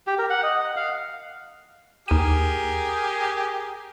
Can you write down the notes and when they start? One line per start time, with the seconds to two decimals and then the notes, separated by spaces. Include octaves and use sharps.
0.07 G4
0.18 A#4
0.30 F#5
0.43 D#5
0.61 F#5
0.76 F5
2.08 D#2 G4 G#4 A#4 D#7